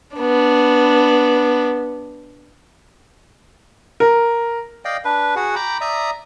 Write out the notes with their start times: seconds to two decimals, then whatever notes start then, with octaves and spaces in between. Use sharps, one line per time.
0.17 B3 D4
4.00 A#4
4.85 D5 D#5 F5 G5
5.05 D4 B4
5.36 F#4 G#4 F#5
5.56 G5 A#5 B5 D6
5.81 D5 E5 A#5 D#6